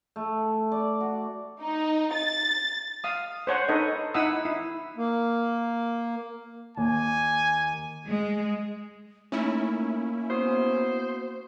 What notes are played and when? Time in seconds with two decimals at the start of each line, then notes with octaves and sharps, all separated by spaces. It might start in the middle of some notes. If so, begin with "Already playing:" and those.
0.16 A3
0.72 D5
1.01 F#4
1.62 D#4
2.13 A6
3.04 F5 D#6
3.47 C5 C#5 F#5
3.68 D#4 A4 B4 C#5 D#5
4.14 D#4 E4 F#5 D#6 E6
4.45 E4
4.97 A#3
6.77 D#2 G#5
8.07 G#3
9.32 A3 A#3 C#4 D#4 E4
10.30 B3 F#4 C5 D#6